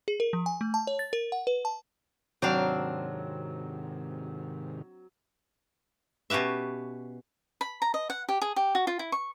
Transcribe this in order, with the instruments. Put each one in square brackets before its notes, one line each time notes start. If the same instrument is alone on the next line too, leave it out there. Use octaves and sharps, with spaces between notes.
[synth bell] G#4
A#4
F3
G#5
A3
A5
C#5
A6
A#4
F#5
B4
A5
[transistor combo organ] G#2 C3 D#3 [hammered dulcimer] F#3 [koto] C4 D4 F5
[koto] B2 C#4 G4 B4 E5
[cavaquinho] B5
A#5
D#5
F#5
G4
G#4
G4
F#4
F4
E4
C#6